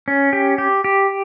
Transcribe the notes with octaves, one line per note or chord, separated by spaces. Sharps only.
C#4
G4
G4
G4